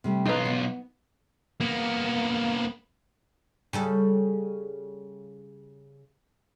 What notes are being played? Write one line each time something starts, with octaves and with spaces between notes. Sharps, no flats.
C3 G3 A3
B1 D#4 F4 A4 B4
B3
A#3 B3
C#3 G3 A4